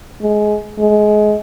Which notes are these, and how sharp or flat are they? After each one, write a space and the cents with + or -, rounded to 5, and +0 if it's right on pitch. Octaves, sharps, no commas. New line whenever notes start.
G#3 +20
G#3 +25